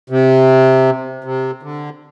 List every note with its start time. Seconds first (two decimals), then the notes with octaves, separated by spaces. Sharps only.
0.10 C3
1.24 C3
1.63 D3